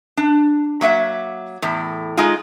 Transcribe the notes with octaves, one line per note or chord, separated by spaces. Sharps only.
D4
F#3 A#3 E5 F#5
E2 A2
G#3 D#4 F4